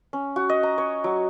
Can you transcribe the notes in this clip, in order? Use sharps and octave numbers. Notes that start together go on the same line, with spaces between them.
C#4
F#4
D#5
A#5
C#5
F#3